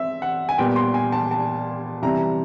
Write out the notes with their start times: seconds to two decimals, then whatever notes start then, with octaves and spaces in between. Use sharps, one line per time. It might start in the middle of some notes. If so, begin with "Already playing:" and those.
Already playing: C4 E5
0.22 F#5
0.49 G#5
0.58 A#2 G3 B3 G5
0.76 C6
0.94 G#5
1.12 A5
1.31 A5
2.03 C3 E3 G3 A#5